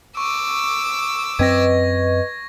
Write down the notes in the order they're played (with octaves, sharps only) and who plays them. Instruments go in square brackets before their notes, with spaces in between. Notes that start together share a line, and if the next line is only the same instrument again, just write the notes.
[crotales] C#6 [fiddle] D6 E6
[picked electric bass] F#2 C4 [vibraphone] B4 D#5 [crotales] G#6 A#6